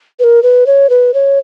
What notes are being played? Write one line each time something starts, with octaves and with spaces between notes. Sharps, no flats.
B4
A#4
B4
C#5
B4
C#5